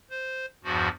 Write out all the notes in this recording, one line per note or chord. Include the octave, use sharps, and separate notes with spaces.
C5
E2 G2 F3 F#4